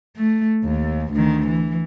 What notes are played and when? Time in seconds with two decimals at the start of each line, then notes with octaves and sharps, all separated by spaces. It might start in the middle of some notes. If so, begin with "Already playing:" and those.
0.16 A3
0.65 D#2
1.13 D2 D#3
1.47 E3